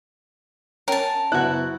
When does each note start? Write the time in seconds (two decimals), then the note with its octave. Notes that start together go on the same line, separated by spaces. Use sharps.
0.88 C#4 A#4 G5 A5
1.32 F#1 B3 E4 F#4 F#6